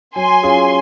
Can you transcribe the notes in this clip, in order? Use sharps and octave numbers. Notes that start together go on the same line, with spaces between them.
F#3 G#5 C6
C#4 F4 G#4